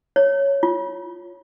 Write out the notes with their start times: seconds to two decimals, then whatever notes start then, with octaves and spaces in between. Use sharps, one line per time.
0.16 C#5
0.63 F4